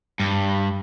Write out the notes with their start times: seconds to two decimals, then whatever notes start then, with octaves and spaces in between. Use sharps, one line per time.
0.20 G2